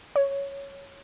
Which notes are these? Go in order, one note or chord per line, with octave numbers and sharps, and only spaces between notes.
C#5